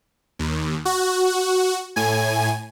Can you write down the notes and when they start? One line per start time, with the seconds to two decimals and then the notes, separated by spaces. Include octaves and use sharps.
0.39 D#2
0.85 F#4
1.96 A2 G#5